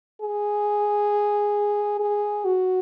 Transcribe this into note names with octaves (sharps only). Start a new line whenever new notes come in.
G#4
G#4
F#4